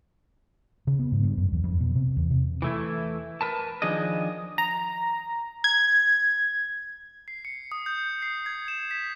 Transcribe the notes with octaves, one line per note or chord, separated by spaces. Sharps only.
C#3
B3
G#2
G2
F#2
E2
F2
B2
C3
E2
C3
E3 A3 E4
A#4 B4 A5
D#3 F3 D4 G#4 D#5
A#5
G#6
C7
C#7
D#6
G6
C7
G#6
E7
B6